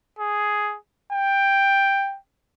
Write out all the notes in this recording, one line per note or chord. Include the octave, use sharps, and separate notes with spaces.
G#4
G5